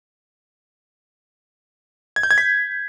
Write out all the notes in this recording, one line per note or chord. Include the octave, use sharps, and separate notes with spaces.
G#6
G6
G#6
B6